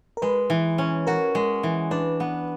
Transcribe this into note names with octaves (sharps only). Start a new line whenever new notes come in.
A#4
G#3 B4
E3
C#4
F#4 A#4
G#3
E3
D4 B4
B3